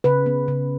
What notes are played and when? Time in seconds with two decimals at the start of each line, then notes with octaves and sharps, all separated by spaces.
0.04 C#3 B4
0.26 B3
0.48 C#3